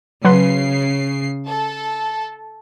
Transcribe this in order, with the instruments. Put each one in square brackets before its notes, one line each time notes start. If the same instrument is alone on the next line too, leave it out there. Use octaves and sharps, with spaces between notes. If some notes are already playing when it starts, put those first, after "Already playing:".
[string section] C#3 C7 [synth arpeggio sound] F#3 B4 C6
[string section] A4